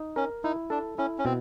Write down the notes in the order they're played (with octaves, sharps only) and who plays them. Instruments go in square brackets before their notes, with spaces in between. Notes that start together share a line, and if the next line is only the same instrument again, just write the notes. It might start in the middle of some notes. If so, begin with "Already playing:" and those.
Already playing: [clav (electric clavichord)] D#4
[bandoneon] C#4 [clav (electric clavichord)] A#4
[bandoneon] D#4 [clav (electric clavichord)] E4
[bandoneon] D4 [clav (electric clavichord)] A4
[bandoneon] C#4 [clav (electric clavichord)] E4
[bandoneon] C#4
[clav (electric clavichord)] B2 [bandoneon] C4